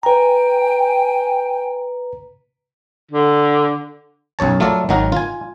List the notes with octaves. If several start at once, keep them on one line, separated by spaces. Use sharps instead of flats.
B4 G5 G#5 A#5
D3
B1 F#2 C#5 A5
F#3 A3 F4 A4 A#4 D5
G#1 D#3 F#3 D#4 F#4 A#4
F4 G#5